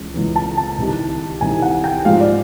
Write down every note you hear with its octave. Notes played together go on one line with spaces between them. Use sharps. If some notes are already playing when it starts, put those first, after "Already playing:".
Already playing: C#2 C#3 E3
C#2 C#3 E3
A5
A5
C2 C3 D#3 G3
C2 C3 D#3 G3 G#5
F#5
G5
G#2 F3 G#3 F5
D5